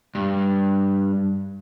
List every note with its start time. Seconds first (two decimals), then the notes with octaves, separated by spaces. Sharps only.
0.15 G2